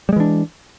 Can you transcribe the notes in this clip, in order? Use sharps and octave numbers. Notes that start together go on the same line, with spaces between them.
E3 G3 G#3 D4